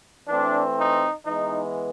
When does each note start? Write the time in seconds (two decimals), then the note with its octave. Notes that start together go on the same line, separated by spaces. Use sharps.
0.28 E3 A3 C4 D4
0.78 D#4
1.26 E3 G#3 B3 D#4